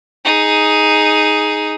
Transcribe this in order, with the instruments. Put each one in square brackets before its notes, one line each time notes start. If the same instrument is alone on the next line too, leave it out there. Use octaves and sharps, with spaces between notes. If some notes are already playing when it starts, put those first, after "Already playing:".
[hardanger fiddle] D#4 G#4